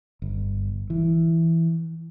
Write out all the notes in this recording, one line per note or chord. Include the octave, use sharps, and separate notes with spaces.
G1
E3